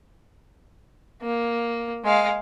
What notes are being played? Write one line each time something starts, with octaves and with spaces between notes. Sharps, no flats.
A#3
G#3 F5